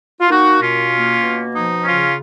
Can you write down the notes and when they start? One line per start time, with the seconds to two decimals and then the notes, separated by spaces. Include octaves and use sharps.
0.21 F4
0.30 A#3 D#4 F#4
0.61 B2 C#4 F4
0.92 A#3
1.23 B2
1.54 F3 D#4
1.84 C#3 C#4 F4